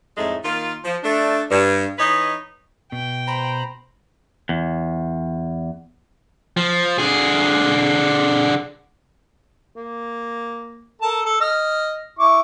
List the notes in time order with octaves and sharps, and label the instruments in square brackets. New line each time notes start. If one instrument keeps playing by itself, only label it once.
[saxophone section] F2 A2 G#3 A3 D#4
D#3 A#3 F4
F3
A3 D4
G2
E3 D#4 B4 C#5 D#5
[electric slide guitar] B2 [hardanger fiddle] G5
[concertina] C5 A#5 [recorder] B5
[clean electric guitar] E2
[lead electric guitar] F3
D3 G#4
[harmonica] A#3
A4 A#4 A5
A4
D#5 F6
E4 C#6 D6